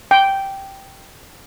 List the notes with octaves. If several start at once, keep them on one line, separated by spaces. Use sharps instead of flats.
G5